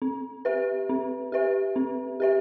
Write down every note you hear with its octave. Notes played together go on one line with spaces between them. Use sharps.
C4
G4 B4 E5
C4
G4 B4 E5
C4
G4 B4 E5